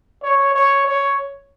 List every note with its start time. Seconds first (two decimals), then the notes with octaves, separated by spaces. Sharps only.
0.22 C#5
0.54 C#5
0.86 C#5